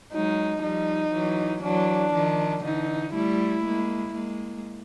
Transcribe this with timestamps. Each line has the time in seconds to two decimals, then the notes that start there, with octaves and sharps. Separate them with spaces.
0.13 F#3 G#3 D#4
0.63 F3 G3 D#4
1.13 E3 F#3
1.63 E3 F#3 D4
2.14 D#3 F3
2.64 D3 E3 D#4
3.14 G3 A3 E4
3.64 G#3 A#3
4.15 G#3 A#3